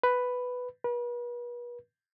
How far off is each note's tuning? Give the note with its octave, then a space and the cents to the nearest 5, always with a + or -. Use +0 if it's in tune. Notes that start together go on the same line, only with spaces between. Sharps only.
B4 +5
B4 -40